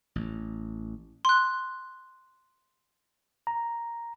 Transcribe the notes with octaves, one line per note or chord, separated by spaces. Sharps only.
A1
C6 F#6
A#5